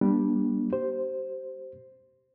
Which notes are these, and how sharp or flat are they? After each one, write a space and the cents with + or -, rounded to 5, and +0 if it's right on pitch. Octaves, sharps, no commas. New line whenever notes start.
G3 +0 A#3 +40 D4 +0
G4 -30 C5 +0